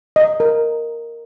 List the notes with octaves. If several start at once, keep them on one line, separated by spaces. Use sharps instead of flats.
D#5
A#4